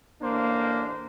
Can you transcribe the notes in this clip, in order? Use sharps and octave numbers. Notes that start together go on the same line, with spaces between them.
A1 A#3 D4 C5